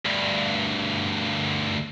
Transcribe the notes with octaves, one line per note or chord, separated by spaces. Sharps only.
D2 G2